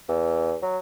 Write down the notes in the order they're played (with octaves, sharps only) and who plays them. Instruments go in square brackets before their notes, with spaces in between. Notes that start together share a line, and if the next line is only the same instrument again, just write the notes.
[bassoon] E2
F#3